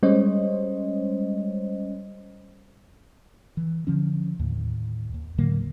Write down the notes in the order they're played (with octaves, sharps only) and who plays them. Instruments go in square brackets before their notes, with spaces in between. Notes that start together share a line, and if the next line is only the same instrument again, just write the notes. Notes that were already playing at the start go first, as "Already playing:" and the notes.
[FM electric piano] G3 G#3 C#4 C5 C#5 D#5
[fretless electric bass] E3
D3 F3 C#4
D#2 A2
D#2
A2 D3 F#3 A#3